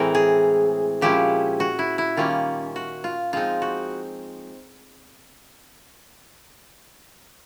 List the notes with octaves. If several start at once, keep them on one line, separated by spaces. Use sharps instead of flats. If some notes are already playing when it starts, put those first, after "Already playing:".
Already playing: A2 E3 G#3 C4 A#4
G#4
A#2 F3 G#3 C#4 E4 G4
F#4
E4
E4
D#3 G3 A#3 C#4 F4
F#4
F4
F3 G#3 C4 D#4 F4
F#4